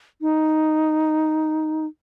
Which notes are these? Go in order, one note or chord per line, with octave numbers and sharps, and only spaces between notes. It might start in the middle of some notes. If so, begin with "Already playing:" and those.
D#4